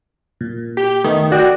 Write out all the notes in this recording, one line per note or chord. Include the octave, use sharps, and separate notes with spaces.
A#2
G4
D#3 A3 B3
F#4 D5 G5